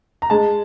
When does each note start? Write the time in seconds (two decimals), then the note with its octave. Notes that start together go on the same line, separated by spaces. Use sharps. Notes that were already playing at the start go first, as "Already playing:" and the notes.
0.22 A#5
0.30 G#3 A5